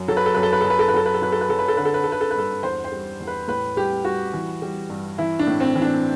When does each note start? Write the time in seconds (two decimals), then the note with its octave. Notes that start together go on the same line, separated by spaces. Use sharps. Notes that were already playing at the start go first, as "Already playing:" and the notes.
Already playing: F#2
0.08 F#3 A4
0.17 B4
0.26 A4
0.34 F#2 B4
0.43 A4
0.53 B4
0.61 F#2 A4
0.70 B4
0.79 A4
0.88 B4
0.94 F#3 A4
1.06 B4
1.14 A4
1.22 F#3 B4
1.32 A4
1.41 B4
1.49 F#3 A4
1.59 B4
1.68 A4
1.77 D3 B4
1.85 A4
1.94 B4
2.04 D3 A4
2.12 B4
2.21 A4
2.31 B4
2.35 G2 A4
2.63 E2 C5
2.84 C5
2.92 G3
3.20 E2
3.27 B4
3.48 A2 B4
3.76 G3 G4
4.05 G3 F#4
4.33 E3
4.62 G3
4.90 G2
5.18 E3 E4
5.39 D4
5.47 A2
5.60 C4
5.75 E3
5.82 D4